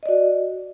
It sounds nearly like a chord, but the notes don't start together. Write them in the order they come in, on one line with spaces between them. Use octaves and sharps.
D#5 D5 F#4